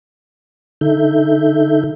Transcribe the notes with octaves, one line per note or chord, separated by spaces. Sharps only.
D3 D#4 A4 E5 G6